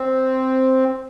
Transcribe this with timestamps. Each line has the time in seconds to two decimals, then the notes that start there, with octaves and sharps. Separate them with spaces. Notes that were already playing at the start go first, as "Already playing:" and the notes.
Already playing: C4